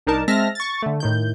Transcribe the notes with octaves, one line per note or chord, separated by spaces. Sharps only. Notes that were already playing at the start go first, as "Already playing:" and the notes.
C2 D4 D#4 A#4 A5
G#3 C4 E5 A5 F6 A#6
C#6 A6
D3 A3
A2 D#3 G6